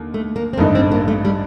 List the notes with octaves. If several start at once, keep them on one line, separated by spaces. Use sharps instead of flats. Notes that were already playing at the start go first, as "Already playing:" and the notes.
Already playing: D#2 D3
A3
A#3
C4
A1 G2 D3 A3 A#3 D#4
C4
A#3
A3
G3